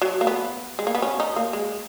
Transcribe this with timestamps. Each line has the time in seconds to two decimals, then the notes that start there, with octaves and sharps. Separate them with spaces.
0.02 F#3
0.21 A#3
0.27 B3
0.79 G#3
0.87 A#3
0.95 B3
1.02 C#4
1.20 D#4
1.36 A#3
1.53 G#3